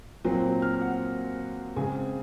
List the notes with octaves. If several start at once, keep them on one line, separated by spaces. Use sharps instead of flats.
A#2 F#3 C4
F6
F#5
C#3 G#3 C4 G#5